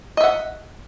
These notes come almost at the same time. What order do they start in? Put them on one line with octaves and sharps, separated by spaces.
D#5 E5 F#5